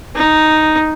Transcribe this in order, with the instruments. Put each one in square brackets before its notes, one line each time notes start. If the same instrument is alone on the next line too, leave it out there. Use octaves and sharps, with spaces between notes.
[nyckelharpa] D#4